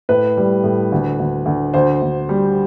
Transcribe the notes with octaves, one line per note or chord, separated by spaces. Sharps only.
A2 B4
G3
A2
D2
D2
D2
D2 C5
D2
G3